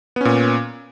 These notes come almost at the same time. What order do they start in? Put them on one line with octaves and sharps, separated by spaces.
B3 C#4 A#2